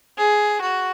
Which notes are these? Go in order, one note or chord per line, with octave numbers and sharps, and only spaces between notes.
G#4
F#4